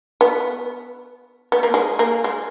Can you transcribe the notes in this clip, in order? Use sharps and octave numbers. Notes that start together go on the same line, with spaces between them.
B3
B3
A#3
G#3
A#3
G#3